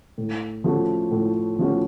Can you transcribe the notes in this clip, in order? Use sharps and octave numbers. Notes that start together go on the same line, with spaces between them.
A2
F3 A3 C#4 F#4
A2
F3 A3 C#4 F#4